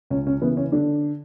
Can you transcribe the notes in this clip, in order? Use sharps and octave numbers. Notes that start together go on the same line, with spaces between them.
C#2 C#4
C#4
C#3 E3 B3
C#4
D3 D4